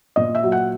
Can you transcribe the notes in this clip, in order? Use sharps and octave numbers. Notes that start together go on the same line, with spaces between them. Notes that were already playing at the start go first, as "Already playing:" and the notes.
A#2 D#5
E5
F#3
F#5